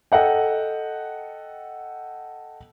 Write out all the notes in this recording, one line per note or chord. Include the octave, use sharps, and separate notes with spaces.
A4 D#5 F#5 G5